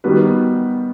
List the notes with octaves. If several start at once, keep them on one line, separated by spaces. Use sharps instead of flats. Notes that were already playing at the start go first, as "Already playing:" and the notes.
D#3 G3 B3 F#4 B4